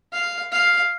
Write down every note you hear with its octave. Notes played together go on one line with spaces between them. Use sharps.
F5
F5